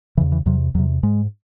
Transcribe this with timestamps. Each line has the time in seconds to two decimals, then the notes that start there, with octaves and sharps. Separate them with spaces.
0.17 C#3 E3
0.21 E2
0.32 E3
0.46 E2 C3 F#3
0.74 E2 F#3
0.79 C3
1.03 G#2 G#3